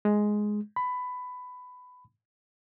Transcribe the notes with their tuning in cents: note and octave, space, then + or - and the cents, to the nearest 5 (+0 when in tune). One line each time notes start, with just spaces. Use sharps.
G#3 +5
B5 +15